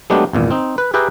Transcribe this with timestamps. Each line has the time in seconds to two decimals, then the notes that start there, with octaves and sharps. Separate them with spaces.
0.10 F#3 G#3 A3 B3 D4 G4
0.33 G#1 E2 A#2
0.51 C4 D#4
0.78 B4
0.94 G4 G#4 B4 E5 G5 A#5